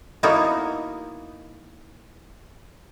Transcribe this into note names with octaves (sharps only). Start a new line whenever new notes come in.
A#3 B3 D#4 E4 F#4